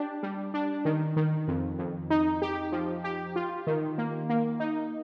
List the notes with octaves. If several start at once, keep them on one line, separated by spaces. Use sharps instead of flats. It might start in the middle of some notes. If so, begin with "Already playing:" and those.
Already playing: D4 G4
G3
D4
D#3
D#3
F2
F2
D#4
G4
F3
G4
F4
D#3
A#3
A#3
D#4